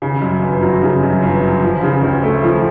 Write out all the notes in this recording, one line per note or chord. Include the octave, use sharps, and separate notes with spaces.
C#3
F#2
G1
F#3
C#3
F#2
G1
F#3
F3
C#3
D2
A3
F3